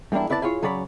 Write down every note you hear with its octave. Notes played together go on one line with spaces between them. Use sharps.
E2 G3 A#3 D4 E4
B3 E4 B4 D5 A5
E4 F4 G#4 C#5
C#3 F#3 C#5 D5 B5